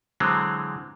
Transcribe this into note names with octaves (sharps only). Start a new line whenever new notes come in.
D3 E3 F#3 G#3 C4